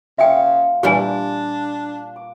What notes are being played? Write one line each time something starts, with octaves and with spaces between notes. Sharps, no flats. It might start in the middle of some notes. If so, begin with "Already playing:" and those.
C#3 A#3 F4 E5 G5 C6
A#2 E3 G3 D4 G4 G#5
D6